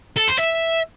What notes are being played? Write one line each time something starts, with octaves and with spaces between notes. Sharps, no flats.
A4
C5
E5